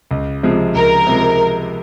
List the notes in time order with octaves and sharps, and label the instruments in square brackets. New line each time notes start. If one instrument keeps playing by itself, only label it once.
[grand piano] C#2
C3 F3 G#3
[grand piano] C#2 [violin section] A#4
[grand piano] C3 F3 G#3